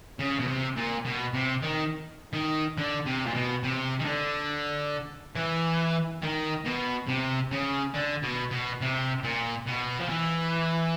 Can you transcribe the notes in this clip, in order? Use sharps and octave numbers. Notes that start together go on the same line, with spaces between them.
C#3
B2
C3
A#2
B2
C3
D#3
D#3
D3
C3
A#2
B2
C3
D#3
D3
E3
D#3
B2
C3
C#3
D3
B2
B2
C3
A#2
B2
F3
E3